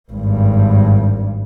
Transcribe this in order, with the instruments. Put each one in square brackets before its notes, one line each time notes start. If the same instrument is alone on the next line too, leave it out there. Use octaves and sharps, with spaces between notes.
[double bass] G#1 G2